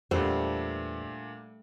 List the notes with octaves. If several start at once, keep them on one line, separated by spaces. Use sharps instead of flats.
E2 A#2 G3 A3 D4 C5 F#5